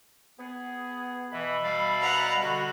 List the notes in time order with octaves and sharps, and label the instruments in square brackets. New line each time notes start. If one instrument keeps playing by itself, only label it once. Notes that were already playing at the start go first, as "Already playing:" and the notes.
[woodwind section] B3 G#4
[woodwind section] B2 E5 B5 [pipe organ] E3
[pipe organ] G3 D5 F5
[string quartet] F#5 A#5
[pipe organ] D3 [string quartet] F#4